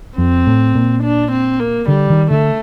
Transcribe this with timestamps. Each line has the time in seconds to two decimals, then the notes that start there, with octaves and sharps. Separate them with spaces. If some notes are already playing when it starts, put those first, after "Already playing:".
0.18 F2 C4
0.47 A2
0.75 A#2
1.03 D4
1.32 C4
1.60 A#3
1.88 D3 G3
2.10 D#3
2.31 D3 A3